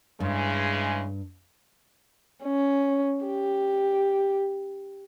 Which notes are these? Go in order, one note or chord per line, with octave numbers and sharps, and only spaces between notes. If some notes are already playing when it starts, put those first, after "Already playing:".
G2 C#3 E3 G#3 A4
C#4
G4